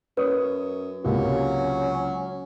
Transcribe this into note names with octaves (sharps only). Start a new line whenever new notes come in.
F#2 B4 C#5 D#6
C#2 C3 F#3 A#3 C#4